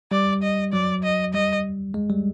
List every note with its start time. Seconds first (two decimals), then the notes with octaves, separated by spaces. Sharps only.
0.11 G3 D5
0.43 D#5
0.73 F#3 D5
1.03 D#5
1.34 G3 D#5
1.94 G#3
2.10 G3